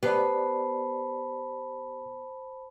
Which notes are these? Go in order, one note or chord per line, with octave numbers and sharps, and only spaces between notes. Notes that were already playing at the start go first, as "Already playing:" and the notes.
B3 G4 C5 D5 A5 B5